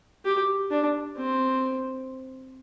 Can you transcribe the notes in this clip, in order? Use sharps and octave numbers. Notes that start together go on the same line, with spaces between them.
G4
D4
C4